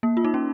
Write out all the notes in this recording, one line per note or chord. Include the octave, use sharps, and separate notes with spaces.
A#3
F4
D#4
C#4